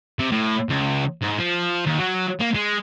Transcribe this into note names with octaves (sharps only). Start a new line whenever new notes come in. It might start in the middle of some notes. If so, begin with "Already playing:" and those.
C3
A2
C#2
G#2
F3
D#2
F#3
A#3
G#3